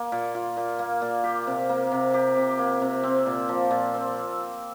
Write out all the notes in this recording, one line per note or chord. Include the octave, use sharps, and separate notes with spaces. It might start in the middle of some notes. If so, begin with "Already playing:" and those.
Already playing: A#3
A#2
F4
A#2
A#3
A#2
G4
C3
A#3
C3
G4
C3
A#3
C3
C4
A#2
F3
A#2
C4